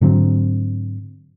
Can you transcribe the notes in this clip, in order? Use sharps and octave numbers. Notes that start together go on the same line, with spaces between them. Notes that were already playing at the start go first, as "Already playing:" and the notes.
G#2 D3 F#3 C4